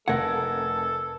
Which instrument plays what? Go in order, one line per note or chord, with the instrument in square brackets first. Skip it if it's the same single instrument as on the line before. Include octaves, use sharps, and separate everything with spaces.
[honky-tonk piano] F1 A3 G#6 [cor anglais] A4 [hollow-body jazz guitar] A#4 F#5